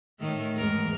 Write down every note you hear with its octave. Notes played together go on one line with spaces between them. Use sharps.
A2 D#3 A3
E2 G#2 A#4